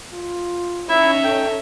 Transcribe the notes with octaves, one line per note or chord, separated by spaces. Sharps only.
F4
C#4 D#4 E4 C#5 E5
A4 G5